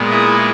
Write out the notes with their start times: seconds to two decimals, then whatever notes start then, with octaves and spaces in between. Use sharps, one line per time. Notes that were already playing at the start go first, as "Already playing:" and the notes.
Already playing: A#2 G#3 B3
0.10 E4 G#4